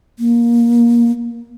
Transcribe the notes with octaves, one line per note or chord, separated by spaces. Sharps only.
A#3